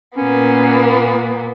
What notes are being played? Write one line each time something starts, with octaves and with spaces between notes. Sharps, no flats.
A#2 A#3 B3 C#4